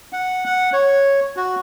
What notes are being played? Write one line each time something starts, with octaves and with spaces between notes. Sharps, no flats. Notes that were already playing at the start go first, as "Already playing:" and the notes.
F#5
F#5
C#5
F#4